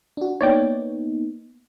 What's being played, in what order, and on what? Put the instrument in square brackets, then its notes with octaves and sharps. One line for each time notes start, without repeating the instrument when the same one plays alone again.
[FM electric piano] D4 F#4
[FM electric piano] A#3 B3 D#4 [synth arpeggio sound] C#5 D5 G5